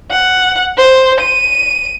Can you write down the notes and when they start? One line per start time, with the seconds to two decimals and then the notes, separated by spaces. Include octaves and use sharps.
0.11 F#5
0.77 C5
1.20 D#7